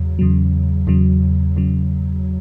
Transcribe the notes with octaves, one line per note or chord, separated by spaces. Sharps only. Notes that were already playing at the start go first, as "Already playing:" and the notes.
Already playing: E2 C#3 F#3
E2 C#3 F#3
E2 C#3 F#3
E2 C#3 F#3